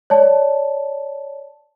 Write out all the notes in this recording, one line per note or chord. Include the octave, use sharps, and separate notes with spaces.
C#5 D5 A5